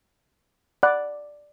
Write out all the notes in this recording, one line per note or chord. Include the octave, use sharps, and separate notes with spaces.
D5 F#5 B5 F#6